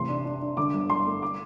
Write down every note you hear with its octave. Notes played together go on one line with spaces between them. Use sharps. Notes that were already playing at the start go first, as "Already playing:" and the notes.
Already playing: A1 C3 C6
D4
D4
D4
D3 D6
G1
G1 C6
A3
D6